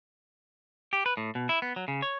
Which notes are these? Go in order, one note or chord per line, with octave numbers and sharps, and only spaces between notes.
G4
B4
A2
B2
E4
B3
F#3
C#3
C#5